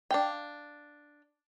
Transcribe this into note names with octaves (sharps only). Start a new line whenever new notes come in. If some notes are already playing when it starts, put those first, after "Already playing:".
D4 F5 G5